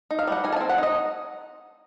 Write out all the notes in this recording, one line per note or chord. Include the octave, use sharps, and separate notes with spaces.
D#4
F5
G3 F#5
D#4 G#5
A5
C4 G#5
F#5
D#4 D#5